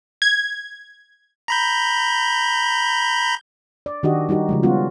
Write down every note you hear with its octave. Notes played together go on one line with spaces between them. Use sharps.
G#6
A#5 B5 G6
D5
D#3 D4 F#4 G4 D#5
G3 D#4 F#4 G4
C#3 F3 G#3
G3 B3 C#4 F4 F#4